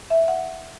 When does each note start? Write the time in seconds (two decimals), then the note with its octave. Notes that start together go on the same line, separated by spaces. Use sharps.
0.10 E5
0.28 F#5